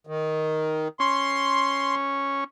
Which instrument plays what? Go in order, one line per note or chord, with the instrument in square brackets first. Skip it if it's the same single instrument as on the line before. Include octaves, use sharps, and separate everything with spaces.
[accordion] D#3
[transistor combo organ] C#4 [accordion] C6